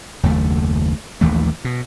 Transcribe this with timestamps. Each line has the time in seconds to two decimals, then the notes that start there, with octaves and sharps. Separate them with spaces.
0.23 F#1 D#2 A3
1.21 A#1 D#2 E3 A3
1.64 B2